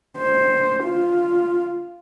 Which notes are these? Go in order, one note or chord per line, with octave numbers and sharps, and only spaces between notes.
C5
F4